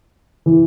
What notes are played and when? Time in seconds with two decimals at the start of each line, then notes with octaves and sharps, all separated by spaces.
0.46 E3